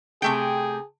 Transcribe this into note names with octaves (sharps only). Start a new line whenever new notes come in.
C3 A3 G#4 G5